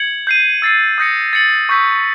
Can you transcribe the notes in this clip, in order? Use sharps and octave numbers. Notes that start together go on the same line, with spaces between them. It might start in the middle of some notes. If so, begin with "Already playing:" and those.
Already playing: G#6 C#7 F#7
G6 C7 D#7
E6 A6 C7 D#7
D#6 G6 A#6 C#7
A6 C#7 F#7
C#6 E6 G6 B6